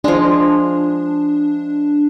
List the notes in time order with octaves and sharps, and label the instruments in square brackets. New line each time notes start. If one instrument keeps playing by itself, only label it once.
[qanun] F3 G#3 [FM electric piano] D4